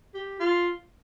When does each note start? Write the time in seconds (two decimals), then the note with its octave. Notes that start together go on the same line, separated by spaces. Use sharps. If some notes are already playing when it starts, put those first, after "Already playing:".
0.14 G4
0.40 F4